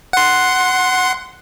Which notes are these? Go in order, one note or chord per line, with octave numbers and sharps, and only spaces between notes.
F#5 C6